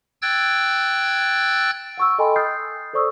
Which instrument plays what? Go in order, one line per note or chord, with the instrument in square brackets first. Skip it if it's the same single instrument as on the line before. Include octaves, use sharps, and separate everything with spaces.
[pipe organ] G5 E6 F#6 G#6 A6
[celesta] F#5 C#6 E6
A4 D#5 G5 G#5 B5 C6
D#6 F6 G6 A6 C7
A4 C5 D5 C#6 D#6 E6